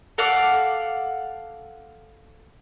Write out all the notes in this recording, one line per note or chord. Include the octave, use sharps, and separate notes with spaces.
A4 F5 F#5 D6